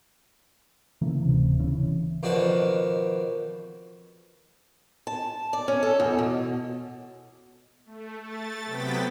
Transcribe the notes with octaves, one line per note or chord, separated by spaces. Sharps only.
C#3 E3 A3 A#3
D1 C3
C#3 E3 C#4
F2 B2 D#3 D4 F#4 A5
A5
D5
C#4
A4
E2
B2
A3
A3 A6
C3 F#3 B3 G5 A6 B6